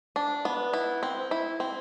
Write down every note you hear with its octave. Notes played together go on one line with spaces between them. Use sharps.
D4
B3
E4
C4
E4
C4